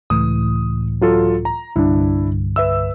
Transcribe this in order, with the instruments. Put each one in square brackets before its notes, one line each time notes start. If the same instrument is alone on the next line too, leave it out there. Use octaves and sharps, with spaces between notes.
[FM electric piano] C#2 A2 E3 [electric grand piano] D#6
[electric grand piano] F#3 F4 A4
A#5
[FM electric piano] C2 G2 D3 [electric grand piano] D4 E4
[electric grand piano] B4 E5 E6